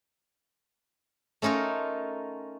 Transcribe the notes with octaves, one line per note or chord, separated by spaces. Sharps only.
A3 C#4 D#4 F4 A#4